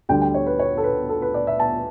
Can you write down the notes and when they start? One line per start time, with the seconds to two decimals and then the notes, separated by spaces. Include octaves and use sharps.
0.09 D2 D3 G3 G5
0.21 G5
0.34 C#5
0.47 B4
0.59 C#5
0.78 A4
0.84 B4
1.09 A4
1.22 B4
1.34 D5
1.47 E5
1.60 A5